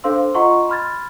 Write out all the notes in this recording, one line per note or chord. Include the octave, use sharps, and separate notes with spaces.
D4 A4 C5 F5 C6 E6
F4 D#5 F#5 A#5 C6 C#6
B5 C6 F6 G#6 A6